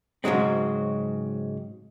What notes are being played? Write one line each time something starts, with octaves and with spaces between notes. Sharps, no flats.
G#2 C#3 F#3 G#3 C4